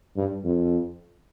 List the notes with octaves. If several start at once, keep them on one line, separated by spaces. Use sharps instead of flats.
G2
F2